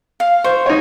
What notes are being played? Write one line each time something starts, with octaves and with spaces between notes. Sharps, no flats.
F5
C5 C#6
D#4 C#5